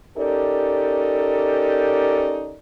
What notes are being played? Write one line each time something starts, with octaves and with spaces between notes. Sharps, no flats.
C#4 D#4 G4 A4 A#4 D5